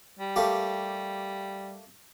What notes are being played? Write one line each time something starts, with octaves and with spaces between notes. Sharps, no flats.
G3
A3 A#3 G4